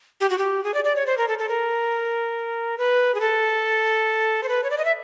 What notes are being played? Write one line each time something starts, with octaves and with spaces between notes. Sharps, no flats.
G4
F#4
G4
G#4
D5
D5
C#5
C5
A#4
A4
A4
A#4
B4
G#4
A4
C5
B4
C#5
D5
D#5
E5